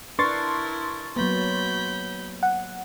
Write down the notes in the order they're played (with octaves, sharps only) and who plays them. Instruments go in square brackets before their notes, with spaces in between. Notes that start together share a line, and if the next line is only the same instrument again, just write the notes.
[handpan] D4 B4 [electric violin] E4 A#4 [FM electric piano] C6 C#6 A6
[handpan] F#3 A#3 B3 [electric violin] B5 G6
[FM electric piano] F#5